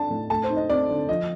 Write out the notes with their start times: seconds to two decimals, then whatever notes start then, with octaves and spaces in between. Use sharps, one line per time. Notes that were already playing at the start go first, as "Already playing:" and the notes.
Already playing: D4 A5
0.10 A2
0.30 A3 A5
0.44 C5
0.50 D#4
0.56 D#5
0.70 C4 D5
0.89 D3
1.09 F3 D#5